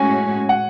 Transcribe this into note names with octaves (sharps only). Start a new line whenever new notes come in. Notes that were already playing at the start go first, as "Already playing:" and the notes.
Already playing: A2 G#3 C#4 F#4 G#5
F#5